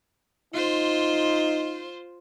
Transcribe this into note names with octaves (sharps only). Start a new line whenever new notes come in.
D#4 F4 C5